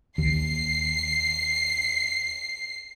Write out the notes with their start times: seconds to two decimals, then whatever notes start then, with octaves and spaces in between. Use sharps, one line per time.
0.18 D#2 C7